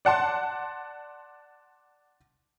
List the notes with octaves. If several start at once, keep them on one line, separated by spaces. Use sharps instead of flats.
D5 F#5 A5 C6